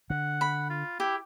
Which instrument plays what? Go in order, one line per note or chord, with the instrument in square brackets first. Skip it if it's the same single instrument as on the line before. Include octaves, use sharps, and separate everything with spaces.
[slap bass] D3 [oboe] F#5
[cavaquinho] B5
[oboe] F4
[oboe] E4 [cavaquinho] G4